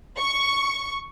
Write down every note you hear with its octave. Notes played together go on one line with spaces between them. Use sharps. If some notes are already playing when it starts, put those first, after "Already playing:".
C#6